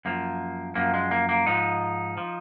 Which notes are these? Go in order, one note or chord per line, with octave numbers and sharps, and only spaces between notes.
F#2 F3 A#3
F#2 F3 A#3
G#3
A#3
A#3
G#2 F3 D#4
F3